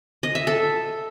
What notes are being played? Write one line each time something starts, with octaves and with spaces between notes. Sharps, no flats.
D#5
E5
A4